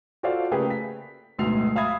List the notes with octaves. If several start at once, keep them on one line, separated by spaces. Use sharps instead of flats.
F4 F#4 A4 C5 D5 F5
C#3 A3 A#3 G4 G#4 B4
B6
D1 D2 G#2 B2 C7 F7
E5 F5 B5 D#6 G#6